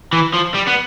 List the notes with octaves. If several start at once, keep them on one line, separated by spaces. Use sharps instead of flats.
E3
F3
G3
B3